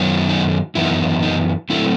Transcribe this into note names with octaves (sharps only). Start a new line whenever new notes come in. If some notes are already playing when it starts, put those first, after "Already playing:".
Already playing: F#2 D#3 F#3 B3
D#4
F#2 E3 B3 D#4 E4
D#4
F#3 A3 C4 E4